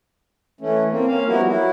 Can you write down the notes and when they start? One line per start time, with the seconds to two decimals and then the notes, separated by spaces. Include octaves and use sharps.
0.61 E3 A3 C#4
0.91 A#3 C4
1.07 A#3 C#4 F5
1.27 F3 G3 B3 E4 F#4 A#4
1.47 F#3 E4 F#4